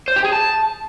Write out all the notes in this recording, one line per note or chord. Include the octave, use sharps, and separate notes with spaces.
C5
G4
G#4
A5